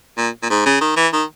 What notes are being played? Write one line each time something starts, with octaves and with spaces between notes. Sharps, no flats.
A#2
A#2
G#2
C#3
D#3
E3
D#3